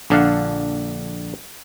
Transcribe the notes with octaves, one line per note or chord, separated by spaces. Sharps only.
A#1 D3 D4 A4 F5 F#5